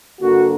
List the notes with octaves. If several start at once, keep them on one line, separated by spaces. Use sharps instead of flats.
G2 D3 A#3 F#4